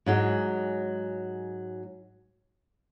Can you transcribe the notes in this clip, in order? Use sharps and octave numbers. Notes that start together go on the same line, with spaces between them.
G#2 F#3 G#3